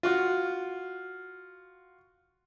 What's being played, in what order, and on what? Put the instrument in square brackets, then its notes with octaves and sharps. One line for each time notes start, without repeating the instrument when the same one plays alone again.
[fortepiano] F4 F#4